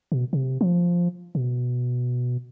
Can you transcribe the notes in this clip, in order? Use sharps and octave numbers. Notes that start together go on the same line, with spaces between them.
B2
C3
F3
B2